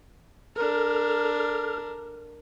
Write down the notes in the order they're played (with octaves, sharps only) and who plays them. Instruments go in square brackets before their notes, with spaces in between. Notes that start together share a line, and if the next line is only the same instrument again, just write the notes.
[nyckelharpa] D4 A#4 [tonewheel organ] A4 F6